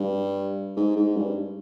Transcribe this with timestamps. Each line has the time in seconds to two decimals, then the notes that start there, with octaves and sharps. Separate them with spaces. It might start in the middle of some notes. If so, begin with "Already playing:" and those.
Already playing: G2
0.76 G#2
0.96 G#2
1.17 G2